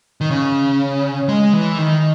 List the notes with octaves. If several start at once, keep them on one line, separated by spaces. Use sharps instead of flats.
D#3
C#3
G#3
E3
D#3